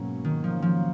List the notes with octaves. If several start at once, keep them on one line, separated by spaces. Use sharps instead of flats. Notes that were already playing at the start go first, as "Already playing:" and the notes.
Already playing: G#2 B2 F#3 A#3 C#4
D#3
F3
F3